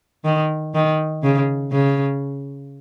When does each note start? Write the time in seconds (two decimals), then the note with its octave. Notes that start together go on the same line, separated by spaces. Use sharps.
0.25 D#3
0.74 D#3
1.23 C#3
1.72 C#3